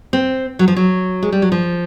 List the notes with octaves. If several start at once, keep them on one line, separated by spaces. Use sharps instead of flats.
C4
F#3
F3
F#3
G#3
G3
F#3
F3